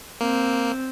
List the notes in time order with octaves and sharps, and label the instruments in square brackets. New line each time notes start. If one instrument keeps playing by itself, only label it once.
[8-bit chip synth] A#3 [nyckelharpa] C4